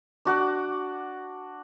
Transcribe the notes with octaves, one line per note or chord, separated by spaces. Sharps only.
D4 F#4 F#5 D6